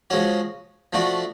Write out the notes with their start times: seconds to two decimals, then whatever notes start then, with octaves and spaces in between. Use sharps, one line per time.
0.10 F3 G#3 C#4 F#4
0.93 F3 A3 D4 F#4